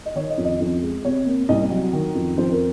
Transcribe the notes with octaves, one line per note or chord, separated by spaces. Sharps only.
D#5
D#3 C#5
D#5
F2
D#5
F2
G#3
C3 C#5
A#3
C2 D#5
F#3
D#3
F2
F2 C5
A#4